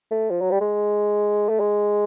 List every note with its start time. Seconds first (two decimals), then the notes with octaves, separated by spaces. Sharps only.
0.11 A3
0.31 F3
0.41 F#3
0.51 G3
0.61 G#3
1.49 A3
1.60 G#3